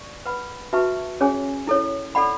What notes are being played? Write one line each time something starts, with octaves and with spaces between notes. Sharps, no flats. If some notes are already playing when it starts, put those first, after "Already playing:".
Already playing: D5 C#6
B4 F#5 B5
F#4 B4 E5 A5 C#6
C#4 G#4 C#5 G#5
E4 A4 C#5
A4 D5 F#5 B5